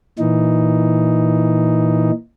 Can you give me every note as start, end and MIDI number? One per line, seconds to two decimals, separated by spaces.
0.19 2.11 46
0.19 2.11 52
0.19 2.11 63